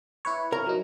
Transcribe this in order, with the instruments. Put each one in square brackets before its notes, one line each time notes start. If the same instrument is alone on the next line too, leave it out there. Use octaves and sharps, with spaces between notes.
[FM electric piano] E4 B4 C#5
[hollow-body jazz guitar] A#4 A#5
[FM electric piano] F#3 D#4